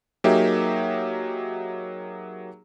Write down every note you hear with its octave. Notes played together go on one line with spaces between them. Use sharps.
F#3 A#3 D#4 G4 G#4 E5